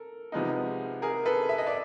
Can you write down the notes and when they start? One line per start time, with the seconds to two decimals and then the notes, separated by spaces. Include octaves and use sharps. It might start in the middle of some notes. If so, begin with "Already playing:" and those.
Already playing: A4 A#4
0.32 C3 F3 G#3 B3 D#4
1.02 G#4 A#4
1.26 A4 B4
1.49 E5
1.58 D#5
1.66 D5 E5